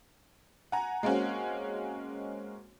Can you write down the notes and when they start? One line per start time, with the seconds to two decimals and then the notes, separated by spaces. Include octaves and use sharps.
0.72 F#5 G#5 A#5
1.03 G#3 A#3 C4 C#4 F#4